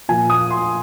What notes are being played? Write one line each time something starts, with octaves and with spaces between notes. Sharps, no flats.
A#2 F3 G#5
D#6
C6